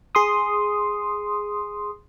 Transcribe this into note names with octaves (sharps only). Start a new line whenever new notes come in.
G#4 C6 D#6